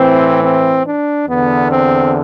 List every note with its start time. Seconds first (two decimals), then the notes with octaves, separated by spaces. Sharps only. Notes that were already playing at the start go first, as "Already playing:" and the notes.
Already playing: A2 E3 C4
0.43 C4
0.85 D4
1.27 E2 D3 B3
1.70 C4